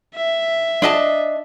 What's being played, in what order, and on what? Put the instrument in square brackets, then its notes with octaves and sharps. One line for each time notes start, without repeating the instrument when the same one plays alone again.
[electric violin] E5
[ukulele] D4 D#5 A5